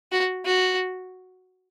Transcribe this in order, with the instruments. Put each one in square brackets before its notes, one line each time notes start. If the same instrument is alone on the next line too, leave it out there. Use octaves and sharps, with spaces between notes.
[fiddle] F#4
F#4